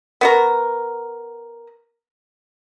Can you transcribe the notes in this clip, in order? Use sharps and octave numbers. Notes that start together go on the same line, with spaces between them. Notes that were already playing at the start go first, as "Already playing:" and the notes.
B3 F#4 A#4